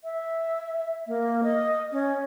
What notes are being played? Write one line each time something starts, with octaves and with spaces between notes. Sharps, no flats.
E5
A#3
D#5
C#4